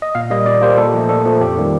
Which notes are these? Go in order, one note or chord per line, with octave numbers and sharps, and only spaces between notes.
D#5
A#2 F5
G3 A#3 D#5
A#2 D5
G3 A#3 C5
A#2 A4
F3 A3
A#2 A4
F3 A3
F2 G4
D#3 G3 A#3